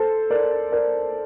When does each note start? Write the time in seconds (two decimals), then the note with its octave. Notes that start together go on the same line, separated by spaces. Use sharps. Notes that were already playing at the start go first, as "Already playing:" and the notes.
Already playing: A4 C5
0.30 A#4 D5
0.72 A#4 D5